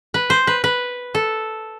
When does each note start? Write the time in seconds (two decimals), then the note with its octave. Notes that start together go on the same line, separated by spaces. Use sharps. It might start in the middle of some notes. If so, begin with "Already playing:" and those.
0.14 B4
0.30 C5
0.47 B4
0.64 B4
1.15 A4